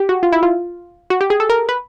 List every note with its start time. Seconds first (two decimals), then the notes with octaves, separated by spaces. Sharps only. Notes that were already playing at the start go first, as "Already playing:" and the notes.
Already playing: G4
0.09 F#4
0.23 F4
0.32 E4
0.43 F4
1.10 F#4
1.21 G4
1.30 G#4
1.40 A4
1.50 A#4
1.69 B4